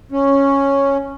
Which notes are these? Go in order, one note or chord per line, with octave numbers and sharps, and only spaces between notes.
C#4